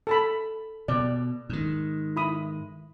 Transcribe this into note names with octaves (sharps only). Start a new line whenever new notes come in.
A4 A5 B5
B2 D5
G#2 D#3
E4 B5 D#6